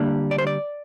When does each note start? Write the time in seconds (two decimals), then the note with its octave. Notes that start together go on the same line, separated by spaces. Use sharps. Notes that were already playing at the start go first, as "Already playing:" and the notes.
Already playing: D3 G3 A#3 D4
0.31 D5
0.38 C5
0.47 D5